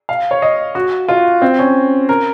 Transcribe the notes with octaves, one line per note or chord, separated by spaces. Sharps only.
F5
C#5
D#5
F#4
F4
C4
C#4
A#4